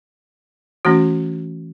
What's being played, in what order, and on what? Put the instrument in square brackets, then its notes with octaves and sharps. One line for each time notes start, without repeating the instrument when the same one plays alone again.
[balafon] E3 A3 C#4 F#4